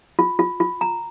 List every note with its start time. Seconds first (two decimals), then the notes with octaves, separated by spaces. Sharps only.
0.19 F4
0.39 F4
0.60 F4
0.81 A#5